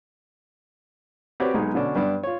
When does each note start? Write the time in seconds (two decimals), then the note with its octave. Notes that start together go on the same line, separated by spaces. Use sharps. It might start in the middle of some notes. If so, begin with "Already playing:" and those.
1.40 C4 F#4 G4 B4 C#5 D5
1.54 B1 G#3 D#4
1.74 B2 D3 C#4 D4
1.95 G2 B3 D4
2.23 F4 C#5